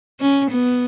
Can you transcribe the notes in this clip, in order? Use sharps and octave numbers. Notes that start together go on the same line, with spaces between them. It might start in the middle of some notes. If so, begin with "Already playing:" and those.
C#4
B3